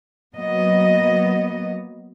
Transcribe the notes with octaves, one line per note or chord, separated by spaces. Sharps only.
F#3 A#3 B3 D#5